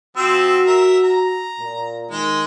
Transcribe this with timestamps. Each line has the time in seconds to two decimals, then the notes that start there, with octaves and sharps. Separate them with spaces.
0.17 F3 C4 F#4 E6
0.67 A#4 E5
1.03 A#5
1.60 A#2
2.11 D#3 G#3